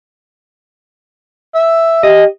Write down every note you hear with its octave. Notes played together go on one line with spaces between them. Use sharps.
E5
G4 D#5